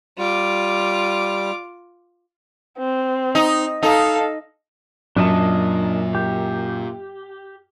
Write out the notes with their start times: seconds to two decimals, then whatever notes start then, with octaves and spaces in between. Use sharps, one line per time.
0.18 G3 F4 D6
2.78 C4
3.35 D#4
3.83 D#4 A4 F5
5.17 F#2 A#2 D4 D#5 A5
6.15 G4